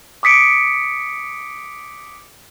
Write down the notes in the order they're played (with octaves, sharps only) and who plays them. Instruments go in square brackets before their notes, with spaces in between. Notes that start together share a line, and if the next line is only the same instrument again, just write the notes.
[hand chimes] D6 D#6 B6 C#7 D7